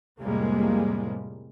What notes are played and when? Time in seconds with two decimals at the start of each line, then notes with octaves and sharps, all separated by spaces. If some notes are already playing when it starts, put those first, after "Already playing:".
0.20 F2 A2 C3 G3 G#3 A#3